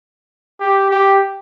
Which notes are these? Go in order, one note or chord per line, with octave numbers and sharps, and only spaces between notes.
G4
G4